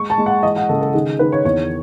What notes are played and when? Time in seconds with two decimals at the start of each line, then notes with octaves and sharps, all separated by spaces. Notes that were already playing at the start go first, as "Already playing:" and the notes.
Already playing: G#3 C#6
0.10 A5
0.18 G#3
0.26 F#5
0.43 E3 D#5
0.56 F#5
0.69 C#3 A4
0.81 A4
0.94 D#3 G#4
1.19 D#3 B4
1.32 C#5
1.45 E2 C#5